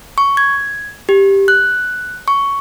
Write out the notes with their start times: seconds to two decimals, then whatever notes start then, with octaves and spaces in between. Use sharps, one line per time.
0.18 C#6
0.37 G#6
1.09 G4
1.48 F#6
2.28 C#6